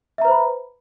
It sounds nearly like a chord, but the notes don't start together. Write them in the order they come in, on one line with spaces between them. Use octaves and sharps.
E5 A#5 B4 C5 B5